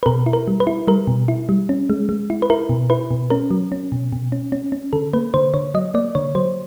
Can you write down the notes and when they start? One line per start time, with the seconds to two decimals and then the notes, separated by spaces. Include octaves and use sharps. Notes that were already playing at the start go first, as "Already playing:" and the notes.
0.03 B4
0.06 B2 A#4
0.26 E4
0.33 A#4
0.48 G3
0.60 B4
0.67 E4
0.88 G3 A#4
1.07 B2
1.28 E4
1.49 G3
1.69 C#4
1.90 G#3
2.09 G#3
2.30 E4
2.42 B4
2.50 E4 A#4
2.69 B2
2.90 E4 B4
3.11 B2
3.30 C#4 A#4
3.51 F#3
3.72 C#4
3.92 B2
4.12 B2
4.32 C#4
4.52 C#4
4.72 C#4
4.93 D3 A4
5.14 A#3 B4
5.34 D3 C5
5.54 D3 C#5
5.74 F#3 D#5
5.94 A#3 D5
6.15 D3 C#5
6.35 F#3 C5